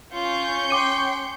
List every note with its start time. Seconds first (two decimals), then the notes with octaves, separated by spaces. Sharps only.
0.13 C#4 F4 C#6 G6
0.70 G5 C6 D6 D#7